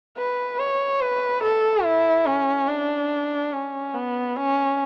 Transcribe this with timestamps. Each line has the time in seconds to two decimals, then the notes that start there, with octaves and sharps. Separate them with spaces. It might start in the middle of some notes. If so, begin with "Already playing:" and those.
0.17 B4
0.59 C#5
1.01 B4
1.43 A4
1.84 E4
2.26 C#4
2.68 D4
3.52 C#4
3.95 B3
4.37 C#4